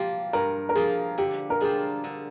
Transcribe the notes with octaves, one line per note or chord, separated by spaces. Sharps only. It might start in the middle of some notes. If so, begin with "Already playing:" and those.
Already playing: F3 A#3 F4 G4
G2 A#4
A#4
F3 A#3 F4 G#4
D3 G4
A#4
G3 D4 F4 G#4 C5
D3